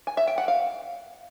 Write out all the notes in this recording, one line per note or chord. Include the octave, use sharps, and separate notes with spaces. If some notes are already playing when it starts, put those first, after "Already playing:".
G#5
E5
G5
F#5
F5